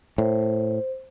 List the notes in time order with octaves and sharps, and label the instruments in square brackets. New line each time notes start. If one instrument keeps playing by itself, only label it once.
[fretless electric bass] A2 [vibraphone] C5